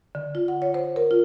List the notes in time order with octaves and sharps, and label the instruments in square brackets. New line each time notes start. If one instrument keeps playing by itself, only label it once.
[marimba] D3
F4
F#5
C#5
C5
A#4
F4